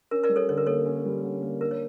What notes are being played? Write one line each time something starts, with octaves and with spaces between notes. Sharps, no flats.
C#4 A#4
A#4 D5
G3
A4 C#5
D3 C#5
A#4
A#3 A4 C#5
C#4
G3
D3
A#3
D4 A#4
C#5